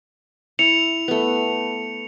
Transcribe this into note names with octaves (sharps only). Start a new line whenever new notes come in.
E4 C#7 F7
A3 B3